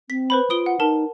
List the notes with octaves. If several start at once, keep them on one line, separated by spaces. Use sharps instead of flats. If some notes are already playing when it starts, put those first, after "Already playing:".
C4 B6
B4 C5 B5
F4 D#6 D7 G7
F#5
D#4 A#4 A5